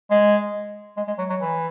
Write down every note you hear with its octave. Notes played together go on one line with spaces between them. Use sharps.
G#3
G#3
G#3
F#3
F#3
E3